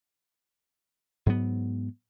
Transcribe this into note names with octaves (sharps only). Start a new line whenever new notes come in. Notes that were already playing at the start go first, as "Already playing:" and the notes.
G#2 F#3 B3